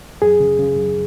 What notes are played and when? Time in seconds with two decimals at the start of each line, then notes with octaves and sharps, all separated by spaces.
0.22 F#2 G#4
0.40 C#3
0.59 C#3
0.77 F#2